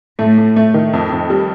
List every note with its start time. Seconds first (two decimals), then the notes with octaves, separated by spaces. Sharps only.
0.19 A2 A3
0.38 A3
0.56 A3
0.74 D#3
0.93 F2
1.12 F2
1.30 G3